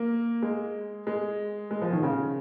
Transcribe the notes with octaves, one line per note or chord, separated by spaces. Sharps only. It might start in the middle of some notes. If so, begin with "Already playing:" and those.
Already playing: A#3
G#3
G#3
G#3
F3
D#3
C#3